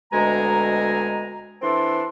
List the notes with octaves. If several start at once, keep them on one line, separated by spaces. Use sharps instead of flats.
D2 B2 G#3 G#5 A#5
E3 C4 D4 A4 C6